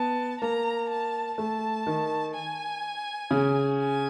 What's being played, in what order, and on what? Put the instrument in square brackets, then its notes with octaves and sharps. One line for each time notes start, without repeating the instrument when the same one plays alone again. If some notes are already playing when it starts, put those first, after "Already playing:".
Already playing: [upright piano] B3 [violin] A5
[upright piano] A#3 [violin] A#5
[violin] A5
[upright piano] A3 [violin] A5
[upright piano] D#3
[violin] G#5
[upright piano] C#3
[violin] G#5